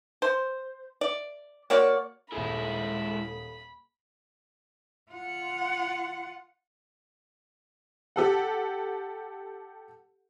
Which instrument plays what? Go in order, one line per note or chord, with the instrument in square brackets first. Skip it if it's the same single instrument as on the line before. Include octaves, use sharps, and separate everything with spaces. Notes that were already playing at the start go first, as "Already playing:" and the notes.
[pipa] C5
D5
A#3 F#4 C#5 D5
[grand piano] D#1 G#4 [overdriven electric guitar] G#3 E4 [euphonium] A4 [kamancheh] B5
[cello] F4 F#5
[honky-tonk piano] G4 A4 F#5